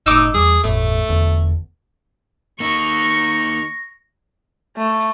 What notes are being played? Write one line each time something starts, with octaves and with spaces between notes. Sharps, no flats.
F#1 A2 D#4 D6 E6
E2 G3 G#4
G1 E2 A2 A3
E1 E2 D3
A#3 D#4 C#6 A#6
A3